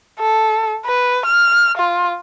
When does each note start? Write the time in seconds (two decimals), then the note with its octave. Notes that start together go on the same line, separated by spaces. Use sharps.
0.20 A4
0.86 B4
1.26 F6
1.78 F4